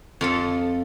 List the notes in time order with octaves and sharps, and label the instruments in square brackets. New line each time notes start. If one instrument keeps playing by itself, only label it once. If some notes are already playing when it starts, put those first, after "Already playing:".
[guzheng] F2 F3 A4